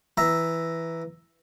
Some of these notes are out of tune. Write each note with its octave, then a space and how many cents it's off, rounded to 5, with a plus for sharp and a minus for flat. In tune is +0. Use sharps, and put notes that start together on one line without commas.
E3 +0 E5 +0 A#5 +0